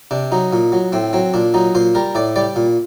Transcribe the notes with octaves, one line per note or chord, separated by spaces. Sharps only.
C3 D4
F#3 D#4
A#2
F#3
A2 C4
F#3 C4
A#2 D4
F#3 D#4
A#2 C5
G3 A#4
A2 D5
G3 D5
A#2